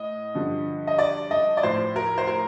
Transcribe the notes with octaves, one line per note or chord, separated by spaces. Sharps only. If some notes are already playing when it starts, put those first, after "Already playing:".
Already playing: A2 D#5
G2 D3 F3
D#5
D5
D#5
D5
A2 F3 C5
A#4
C5
A#4